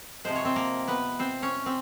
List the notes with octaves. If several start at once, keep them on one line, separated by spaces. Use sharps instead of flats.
C3 F3 G#3 C5
C#5
C4 C5
A#3 A#4
B3 B4
C4 C5
C#4 C#5
C4